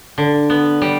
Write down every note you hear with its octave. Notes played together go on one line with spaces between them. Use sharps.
D3 D4
B3
G3